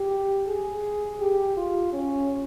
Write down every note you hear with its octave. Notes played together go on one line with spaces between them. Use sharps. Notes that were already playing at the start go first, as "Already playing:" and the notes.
Already playing: G4
G#4
G4
F4
C#4